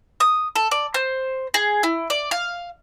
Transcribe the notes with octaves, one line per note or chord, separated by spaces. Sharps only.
D#6
A4
D5
C5
G#4
E4
D5
F5